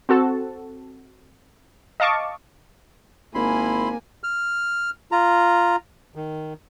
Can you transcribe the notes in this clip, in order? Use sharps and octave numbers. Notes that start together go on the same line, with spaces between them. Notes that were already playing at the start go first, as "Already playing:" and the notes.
C4 F#4 A4 A5
D#5 F5 A5 C#6 D6
G#1 A#3 E4 G#5 B5 C6
F6
F4 A#5
D#3